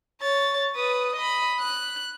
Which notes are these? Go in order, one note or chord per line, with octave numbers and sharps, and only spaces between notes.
C#5 A6
B4 D#6
D#5 B5
F#6